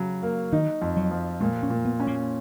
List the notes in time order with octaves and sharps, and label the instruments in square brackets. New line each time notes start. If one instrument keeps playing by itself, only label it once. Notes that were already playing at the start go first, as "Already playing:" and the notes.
Already playing: [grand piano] C#3 F#3
A#3
[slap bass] D#3 [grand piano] D#4
[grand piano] F2
[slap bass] F#3
[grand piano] F3
[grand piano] A#2 [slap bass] G#3
[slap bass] C#4
[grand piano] A#2
[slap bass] B3
[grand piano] C#4
[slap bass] A#3